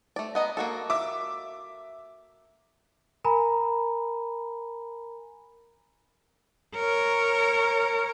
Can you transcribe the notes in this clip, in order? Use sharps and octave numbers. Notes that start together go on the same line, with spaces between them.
A3 D5
B3 D#5 A#5
A#3 F#4 A4
E5 D6
A#4 G#5 A#5 B5
A#4 C#5